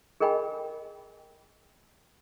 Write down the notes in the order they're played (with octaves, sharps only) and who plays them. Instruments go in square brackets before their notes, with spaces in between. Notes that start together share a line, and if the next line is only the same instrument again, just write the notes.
[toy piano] G#4 A#4 D#5 G5 G#5 B5